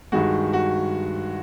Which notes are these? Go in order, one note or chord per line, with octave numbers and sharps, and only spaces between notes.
G2 D#3 G#3 F#4
F#4